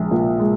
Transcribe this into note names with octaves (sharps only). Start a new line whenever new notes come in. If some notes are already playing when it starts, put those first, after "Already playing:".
Already playing: A#1 G#3
A#2
G#3